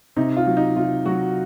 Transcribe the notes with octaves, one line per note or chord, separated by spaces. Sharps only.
C3 D#4
F4
F#3
D#4
C3 F4
F#3 F#4